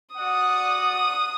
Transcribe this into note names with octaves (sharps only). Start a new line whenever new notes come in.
F#4 D5 F#5 D#6